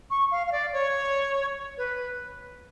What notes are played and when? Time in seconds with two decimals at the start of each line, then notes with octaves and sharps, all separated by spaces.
0.10 C#6
0.31 F5
0.47 F5
0.52 D5
0.73 C#5
1.78 B4